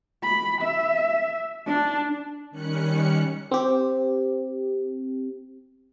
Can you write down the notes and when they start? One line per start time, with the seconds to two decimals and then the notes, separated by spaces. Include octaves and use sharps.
0.24 B5
0.62 E5
1.67 D4
2.51 D#3 G3 C#4 F#6 C#7
3.51 C4 G4